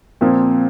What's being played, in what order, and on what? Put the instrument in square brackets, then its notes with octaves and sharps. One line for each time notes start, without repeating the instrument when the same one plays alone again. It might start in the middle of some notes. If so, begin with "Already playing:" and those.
[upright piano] A#2 F3 A#3 [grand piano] C4